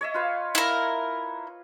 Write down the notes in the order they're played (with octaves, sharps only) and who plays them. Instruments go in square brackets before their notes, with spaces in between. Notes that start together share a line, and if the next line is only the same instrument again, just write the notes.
[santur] C#5 D#5 E5
F4 B4 F5
[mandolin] E4 A#4